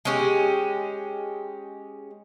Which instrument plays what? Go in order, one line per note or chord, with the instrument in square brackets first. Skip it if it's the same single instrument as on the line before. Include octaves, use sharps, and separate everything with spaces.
[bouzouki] G#3 C#4 G4